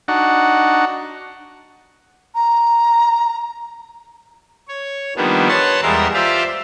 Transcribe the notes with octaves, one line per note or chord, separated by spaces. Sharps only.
D4 D#4 F#4 F#5
A#5
C#5
D#3 F3 G3 A#3 B3 D4
B4 C#5 F#5 A5 C6
E2 G3 G#3 A#4 E5 C6
F4 G4 C5 D5 E5 F5